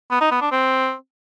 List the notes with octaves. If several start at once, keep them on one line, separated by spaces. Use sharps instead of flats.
B3
D#4
B3
D4
C4